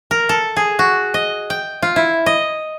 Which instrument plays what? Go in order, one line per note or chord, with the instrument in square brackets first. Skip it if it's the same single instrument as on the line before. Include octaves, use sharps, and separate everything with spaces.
[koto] A#4
A4
G#4
F#4
D#5
G5
F4
E4
D#5